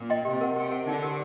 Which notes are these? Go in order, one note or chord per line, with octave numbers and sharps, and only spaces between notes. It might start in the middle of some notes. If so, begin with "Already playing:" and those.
Already playing: A#2
D#5 G5 C6
C3 G4
A#4 F#5
C3 G4
A#4 F#5
D3 D#4
G4 A#4